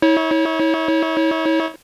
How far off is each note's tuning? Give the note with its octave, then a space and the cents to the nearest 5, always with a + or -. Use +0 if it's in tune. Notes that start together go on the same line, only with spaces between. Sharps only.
E4 -40 C#5 +0